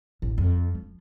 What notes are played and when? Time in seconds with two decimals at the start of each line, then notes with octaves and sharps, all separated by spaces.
0.22 A1
0.38 F2
0.75 F3